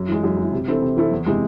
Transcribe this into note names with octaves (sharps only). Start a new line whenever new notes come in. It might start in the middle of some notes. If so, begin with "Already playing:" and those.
Already playing: F#2
E3 G#3
F#2
E3 G#3
C3
E3 C4 E4 A4
C3
E3 C4 E4 A4
E2
C3 E3 G#3